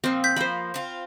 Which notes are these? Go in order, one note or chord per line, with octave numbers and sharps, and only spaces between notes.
A#2 F3 C4
G6 B6
F3 A#3 C5 B5
C4 F4